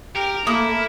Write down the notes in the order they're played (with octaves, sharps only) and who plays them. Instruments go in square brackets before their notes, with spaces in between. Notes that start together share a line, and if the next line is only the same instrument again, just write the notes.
[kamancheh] G4 [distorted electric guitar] A#4
[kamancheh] A3 [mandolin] A#3 D#6 [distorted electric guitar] E4